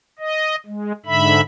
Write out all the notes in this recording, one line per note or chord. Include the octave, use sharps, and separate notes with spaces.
D#5
G#3
G#2 D3 E5 B5